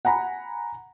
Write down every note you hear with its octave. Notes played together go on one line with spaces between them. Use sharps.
F#5 G#5 A#5 B5